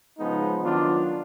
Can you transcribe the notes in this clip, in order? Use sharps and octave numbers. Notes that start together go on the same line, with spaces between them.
C#3 F3 G#3 B3 D#4
D#3 F#3 B3 D4 F4